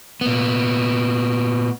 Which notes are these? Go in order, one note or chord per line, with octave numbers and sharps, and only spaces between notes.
A#2 B3